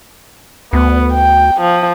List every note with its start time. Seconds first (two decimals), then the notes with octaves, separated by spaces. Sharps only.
0.73 D2 B3
1.13 G5
1.61 F3